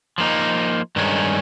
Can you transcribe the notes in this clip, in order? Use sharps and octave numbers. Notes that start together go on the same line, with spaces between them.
F3 A#3 D#4
G2 D#3 G#3 C#4